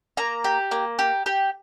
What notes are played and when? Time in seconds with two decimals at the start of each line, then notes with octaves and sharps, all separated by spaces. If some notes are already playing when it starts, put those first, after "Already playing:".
0.17 A#3 A#5
0.44 G4
0.71 A#3
0.99 G4
1.26 G4